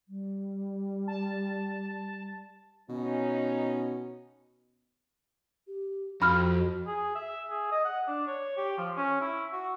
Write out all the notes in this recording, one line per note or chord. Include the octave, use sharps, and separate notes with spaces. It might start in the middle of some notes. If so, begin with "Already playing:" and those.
G3
A5
B2 C#4 D#4
G4
F2 F#4 B5 F6
G#4
E5
G#4
D#5
F#5
D4
C#5
G4
F3
C#4
E4
F#4